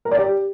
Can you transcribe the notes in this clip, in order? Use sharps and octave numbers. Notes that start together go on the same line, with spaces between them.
A#4
D5
G4